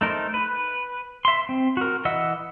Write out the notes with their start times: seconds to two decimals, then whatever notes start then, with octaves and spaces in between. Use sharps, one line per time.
0.01 A3 D#4 A#4 C5
0.34 B4
1.25 E5 C6
1.49 C4
1.77 F#4 A#4
2.05 E3 D#5 E5 F#5 E6